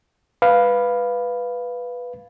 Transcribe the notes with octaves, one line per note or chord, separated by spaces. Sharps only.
B4 F5